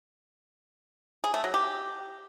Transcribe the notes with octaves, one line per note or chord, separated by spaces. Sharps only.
G#4
A3
F#3
G4